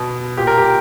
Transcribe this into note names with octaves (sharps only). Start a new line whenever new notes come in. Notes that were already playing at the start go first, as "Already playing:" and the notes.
Already playing: B2
A#2 G4
A#4
G4